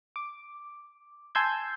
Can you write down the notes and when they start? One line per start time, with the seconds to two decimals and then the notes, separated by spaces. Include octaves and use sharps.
0.16 D6
1.35 G#5 A5 C6 E6 G6 G#6